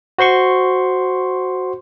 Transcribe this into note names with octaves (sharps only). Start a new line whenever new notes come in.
F#4 C5 C6 C#6